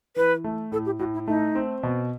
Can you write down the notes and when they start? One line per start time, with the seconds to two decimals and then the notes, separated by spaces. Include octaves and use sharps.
0.16 E3 B4
0.44 A3
0.72 A2 A4
0.86 G4
0.99 A2 F#4
1.14 E4
1.27 A3 D#4
1.55 C4
1.83 B2